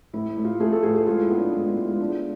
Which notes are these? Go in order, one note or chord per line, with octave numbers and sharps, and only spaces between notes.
A2 E4
A2
F4
A3 G#4
A4
A2 G#4
G#4
G#3 F4
E4
B3
D4
G#3 E4
E4
G#3
F4
D4